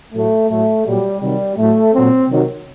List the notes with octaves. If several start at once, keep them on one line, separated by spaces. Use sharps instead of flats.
A2 F#3 A3
A2 F#3 A3
A#2 F#3 G3
C3 D#3 F#3 G3
A2 F#3 A3
A#2 F#3 C4
C3 D#3 F#3